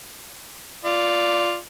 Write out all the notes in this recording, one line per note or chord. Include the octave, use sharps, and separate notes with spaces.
F4 D5